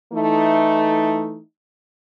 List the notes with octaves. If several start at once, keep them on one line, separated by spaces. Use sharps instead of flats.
E3 A3 D#4